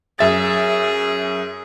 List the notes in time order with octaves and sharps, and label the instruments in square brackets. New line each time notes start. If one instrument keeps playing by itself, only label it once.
[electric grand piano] F#2 E5 A6 [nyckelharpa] G#4